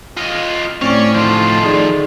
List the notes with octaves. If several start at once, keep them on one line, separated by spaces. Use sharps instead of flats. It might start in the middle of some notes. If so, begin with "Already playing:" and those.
F4 D#5
A2 C4 C#4 D5 C#6
D#3 F3 F4 A4
D#4 G#4 D5